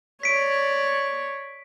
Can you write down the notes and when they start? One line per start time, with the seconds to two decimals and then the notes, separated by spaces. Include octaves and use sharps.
0.23 C#5 D5 B6 D7